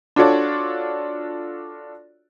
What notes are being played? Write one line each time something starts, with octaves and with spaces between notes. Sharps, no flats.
D4 F4 F#4 A4 C#5 D5